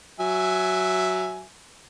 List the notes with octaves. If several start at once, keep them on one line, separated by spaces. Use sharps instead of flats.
F#3 E5 G#5